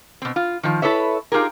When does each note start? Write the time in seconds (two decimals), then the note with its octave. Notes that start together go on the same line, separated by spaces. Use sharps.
0.22 B2 C4
0.36 F4
0.63 D#3 F3
0.82 E4 A4 B4 C#5 E5
1.32 D#4 F4 G4 G#4 A#4